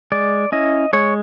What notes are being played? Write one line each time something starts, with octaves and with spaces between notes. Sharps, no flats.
G#3 D5
C#4 E4 D#5
G#3 C#5